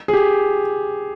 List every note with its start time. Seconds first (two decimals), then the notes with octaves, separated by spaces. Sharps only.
0.08 G#4
0.13 G4